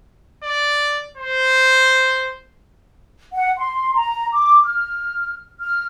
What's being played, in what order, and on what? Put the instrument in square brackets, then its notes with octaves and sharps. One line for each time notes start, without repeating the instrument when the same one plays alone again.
[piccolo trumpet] D5
C5
[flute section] F#5
C6
A#5
D6
F6
F6